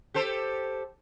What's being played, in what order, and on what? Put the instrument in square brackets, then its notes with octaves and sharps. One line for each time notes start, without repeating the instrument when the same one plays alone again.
[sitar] G4 A4 C5